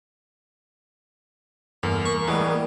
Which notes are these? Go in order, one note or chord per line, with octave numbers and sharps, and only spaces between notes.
E2 G2 A#3 A4
A#3 A#4 C#6
A2 E3 G3 G#3 B3